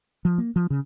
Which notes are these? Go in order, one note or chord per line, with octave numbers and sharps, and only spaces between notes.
F3
A#3
F3
C#3